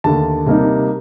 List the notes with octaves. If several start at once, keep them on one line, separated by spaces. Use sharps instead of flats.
D#2 D3 A3 A5
C3 G3 A#3 D#4